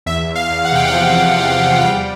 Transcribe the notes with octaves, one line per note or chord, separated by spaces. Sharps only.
E2 E5
E2
F5
E2
F#5
C3 G5
F#5
F3
E2
E2
E2
G3 G5